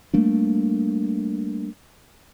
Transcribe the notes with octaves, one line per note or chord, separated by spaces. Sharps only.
G3 A3 A#3 D4